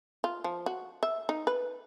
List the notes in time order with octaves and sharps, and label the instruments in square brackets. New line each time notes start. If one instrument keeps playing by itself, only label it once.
[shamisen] F4
F3
F#4
E5
D#4
B4